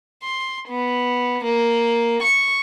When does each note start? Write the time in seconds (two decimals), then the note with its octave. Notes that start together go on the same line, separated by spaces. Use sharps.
0.23 C6
0.69 B3
1.45 A#3
2.23 C#6